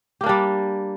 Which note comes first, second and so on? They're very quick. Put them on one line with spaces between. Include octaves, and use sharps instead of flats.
G4 A#3 D4 G3